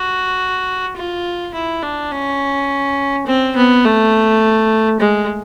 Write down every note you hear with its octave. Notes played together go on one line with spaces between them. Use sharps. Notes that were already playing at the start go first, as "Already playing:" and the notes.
Already playing: F#4
F4
E4
D4
C#4
C4
B3
A3
G#3